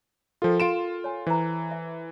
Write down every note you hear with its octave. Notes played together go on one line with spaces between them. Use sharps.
F3 F4 A4 A#4 G5
F4 C6 D7 E7
C#5 G#5
E3 C5 A#5
E5